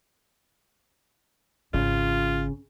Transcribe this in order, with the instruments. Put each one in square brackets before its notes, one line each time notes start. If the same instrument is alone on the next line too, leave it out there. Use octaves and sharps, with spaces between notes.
[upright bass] G#1 [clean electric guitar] C#3 [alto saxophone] F4